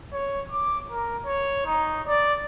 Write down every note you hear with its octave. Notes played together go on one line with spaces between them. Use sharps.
C#5
D6
A#4
C#5
D#4
D5